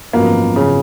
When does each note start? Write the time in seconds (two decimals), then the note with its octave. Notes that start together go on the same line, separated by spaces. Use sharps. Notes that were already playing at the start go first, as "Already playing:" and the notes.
0.13 G#1 F#2 F3 A#3 B3 F#4
0.56 C#3